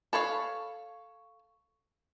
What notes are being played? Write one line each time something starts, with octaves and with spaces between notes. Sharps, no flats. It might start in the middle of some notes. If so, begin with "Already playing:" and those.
A4 B4 C#5 F5